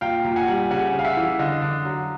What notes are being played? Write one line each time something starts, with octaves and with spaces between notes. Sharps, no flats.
A#2 F5 G5
A#2
F#5 G#5
G3
C#3 F#5 G#5
C#3
F5
E5 F#5
E3
D3 D#5 F5
D3
F#3